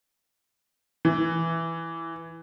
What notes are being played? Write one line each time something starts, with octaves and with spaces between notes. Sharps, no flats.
E3